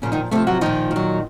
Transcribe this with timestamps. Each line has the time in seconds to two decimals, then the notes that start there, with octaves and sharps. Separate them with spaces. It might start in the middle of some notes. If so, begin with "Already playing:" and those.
0.02 A#2 C#3 F3 C#4
0.12 D#3 D#4
0.31 C3 F3 A3 A4
0.47 F#3 F#4
0.61 A#2 D#3 F3 D#4
0.91 A#2
0.96 F#3